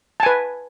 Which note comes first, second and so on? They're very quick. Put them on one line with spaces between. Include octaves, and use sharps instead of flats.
A5 G#5 B4